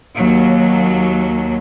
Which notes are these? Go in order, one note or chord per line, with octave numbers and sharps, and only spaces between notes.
D#2 F#3